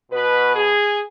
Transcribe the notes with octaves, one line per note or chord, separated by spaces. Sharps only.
B2 B4
G#4